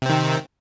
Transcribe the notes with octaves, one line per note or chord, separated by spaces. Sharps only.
C3 D#3 C4